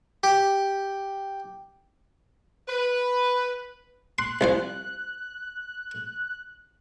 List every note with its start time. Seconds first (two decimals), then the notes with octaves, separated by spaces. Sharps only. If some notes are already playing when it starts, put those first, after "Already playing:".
0.23 G4
2.68 B4
4.19 C6 F#6
4.41 C2 F3 C5